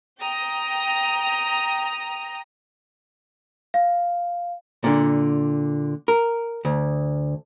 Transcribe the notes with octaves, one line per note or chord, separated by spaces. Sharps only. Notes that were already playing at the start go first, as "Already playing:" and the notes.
G5 A#5 D#6
F5
A#2 D3
A#4
D2